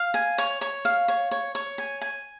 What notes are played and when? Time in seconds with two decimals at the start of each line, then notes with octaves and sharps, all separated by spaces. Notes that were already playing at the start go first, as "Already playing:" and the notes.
Already playing: F5
0.14 G#5
0.38 C#5
0.61 C#5
0.85 F5
1.08 C#5
1.31 C#5
1.55 C#5
1.78 G#5
2.01 G#5